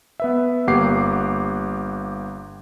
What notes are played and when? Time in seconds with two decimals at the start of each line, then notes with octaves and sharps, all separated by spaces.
0.20 B3 B4 E5
0.67 G1 A#3 G4 F#5 D6 C7